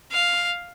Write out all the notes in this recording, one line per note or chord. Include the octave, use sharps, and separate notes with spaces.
F5